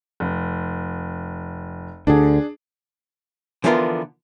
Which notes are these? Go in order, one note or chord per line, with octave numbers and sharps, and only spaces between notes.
F1
D2 D3 D4 G#4
D3 E3 F3 B3 F4 A#4